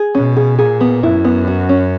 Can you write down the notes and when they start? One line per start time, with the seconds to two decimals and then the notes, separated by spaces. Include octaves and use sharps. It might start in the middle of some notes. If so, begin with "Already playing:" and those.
Already playing: G#4
0.15 B2 C#4
0.37 G#4
0.59 A#2 G#4
0.81 B3
1.03 F#2 E4
1.25 B3
1.47 F#4
1.69 C#4